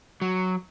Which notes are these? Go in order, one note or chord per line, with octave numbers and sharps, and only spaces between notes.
F#3